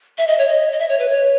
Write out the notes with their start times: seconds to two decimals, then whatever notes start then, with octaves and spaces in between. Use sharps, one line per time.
0.18 E5
0.27 D#5
0.38 C#5
0.48 D#5
0.72 D#5
0.79 E5
0.89 C#5
0.99 B4
1.09 C#5